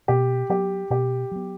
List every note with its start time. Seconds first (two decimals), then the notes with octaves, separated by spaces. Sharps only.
0.08 B2 G4
0.49 F#3 B3 G4
0.90 B2 G4
1.31 F#3 B3